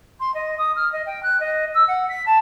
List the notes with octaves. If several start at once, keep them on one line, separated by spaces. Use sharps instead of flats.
C6
D#5
D#6
F6
D#5
G5
F#6
D#5
E6
F#5
B6
A5